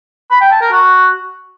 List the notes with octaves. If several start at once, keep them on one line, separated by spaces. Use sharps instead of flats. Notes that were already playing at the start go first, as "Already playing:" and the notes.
B5
G5
A5
A#4
F#4